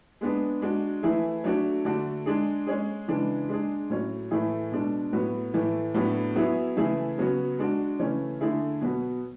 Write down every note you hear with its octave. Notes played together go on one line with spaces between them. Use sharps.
G#3 B3 D4 G#4
G#3 D4 F#4
E3 A3 E4 G#4
F#3 A3 D4 F#4
D3 A3 D4 F#4
G#3 D4 G#4
G#3 C#4 G#4
C#3 E3 G#3 D4
G#3 D4 G#4
A2 F#3 C#4
A2 E3 A3 E4 G#4
B2 G#3 D4
A2 F#3 B3 F#4
A2 E3 A3
A2 F#3 B3 D4 F#4
F#3 B3 E4 G#4
C#3 E3 A3 E4 G#4
C#3 F#3 B3 F#4
G#3 D4 F#4
C#3 E3 A3 C#4
D3 A3 E4 G#4
B2 F#3 B3 F#4